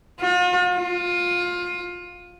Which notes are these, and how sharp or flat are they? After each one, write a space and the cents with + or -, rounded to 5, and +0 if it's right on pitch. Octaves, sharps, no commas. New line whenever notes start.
F4 +45
F4 +20